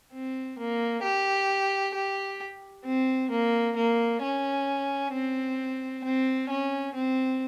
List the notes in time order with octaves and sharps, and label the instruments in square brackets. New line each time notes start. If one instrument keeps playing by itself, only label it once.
[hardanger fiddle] C4
A#3
G4
G4
C4
A#3
A#3
C#4
C4
C4
C#4
C4